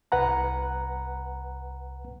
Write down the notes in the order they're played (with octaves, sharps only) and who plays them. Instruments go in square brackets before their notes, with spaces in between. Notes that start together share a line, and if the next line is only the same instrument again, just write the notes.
[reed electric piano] C2 B4 F#5 A#5